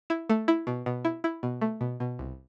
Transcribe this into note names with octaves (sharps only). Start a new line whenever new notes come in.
E4
A3
E4
B2
B2
E4
E4
B2
A3
B2
B2
C2